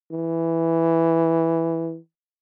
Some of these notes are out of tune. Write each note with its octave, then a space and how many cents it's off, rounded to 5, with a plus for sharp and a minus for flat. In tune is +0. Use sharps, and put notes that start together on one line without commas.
E3 +0